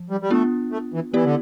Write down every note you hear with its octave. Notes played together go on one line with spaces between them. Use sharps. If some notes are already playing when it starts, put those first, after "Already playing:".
Already playing: F3
G3
G3
A3 B3 D4 F4
A3
E3
E3 B3 E4 G4 D5
D3